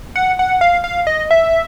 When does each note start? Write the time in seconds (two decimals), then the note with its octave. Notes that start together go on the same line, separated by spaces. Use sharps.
0.16 F#5
0.39 F#5
0.61 F5
0.84 F5
1.07 D#5
1.31 E5